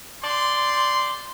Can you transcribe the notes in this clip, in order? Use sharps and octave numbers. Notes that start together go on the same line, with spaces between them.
D5 G5 C6